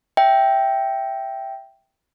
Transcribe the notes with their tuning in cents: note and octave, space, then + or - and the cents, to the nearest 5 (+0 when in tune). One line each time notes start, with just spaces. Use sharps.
E5 +0 G5 +0